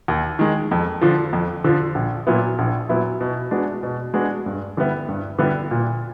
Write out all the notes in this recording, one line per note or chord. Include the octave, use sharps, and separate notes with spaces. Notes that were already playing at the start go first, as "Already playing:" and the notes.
D#2
D#3 G#3
F2
D3 F3
F2
D3 F3
A#1
A#2 F#3 B3 E4
A#1
A#2 F#3 B3 E4
B2
G#3 B3 D4 F#4
B2
G#3 B3 D4 F#4
G2
D3 G3 B3 E4
G2
D3 G3 B3 E4
A#2